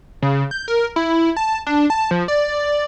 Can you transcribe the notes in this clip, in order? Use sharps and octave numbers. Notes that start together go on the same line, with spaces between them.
C#3
G6
A#4
E4
A5
D4
A5
F3
D5